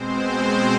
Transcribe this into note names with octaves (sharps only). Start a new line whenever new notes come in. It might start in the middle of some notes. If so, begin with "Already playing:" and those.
Already playing: B2 G#3 C4 C5